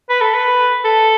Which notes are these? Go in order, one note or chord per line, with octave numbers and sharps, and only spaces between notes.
B4
A4
B4
A4